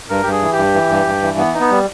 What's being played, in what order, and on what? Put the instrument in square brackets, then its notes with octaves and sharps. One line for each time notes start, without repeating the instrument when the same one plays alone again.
[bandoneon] G2 [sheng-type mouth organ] A#4
[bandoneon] G2 [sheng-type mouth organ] G4
[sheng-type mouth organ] G#4
[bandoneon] E3
[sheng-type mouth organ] G4
[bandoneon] G2
E3
G2
G2
E3
B3
D#4
[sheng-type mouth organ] B3
[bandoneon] G3